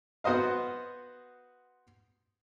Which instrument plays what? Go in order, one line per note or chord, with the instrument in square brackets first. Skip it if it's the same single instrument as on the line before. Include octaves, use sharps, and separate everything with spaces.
[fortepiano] B3 F#4 C5 D#5 F5